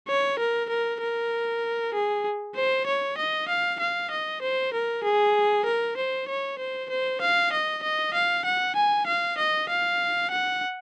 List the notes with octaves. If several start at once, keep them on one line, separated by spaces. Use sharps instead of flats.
C#5
A#4
A#4
A#4
G#4
C5
C#5
D#5
F5
F5
D#5
C5
A#4
G#4
A#4
C5
C#5
C5
C5
F5
D#5
D#5
F5
F#5
G#5
F5
D#5
F5
F#5